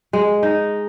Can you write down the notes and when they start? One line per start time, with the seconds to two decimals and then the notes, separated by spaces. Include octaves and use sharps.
0.13 G#3
0.43 D#4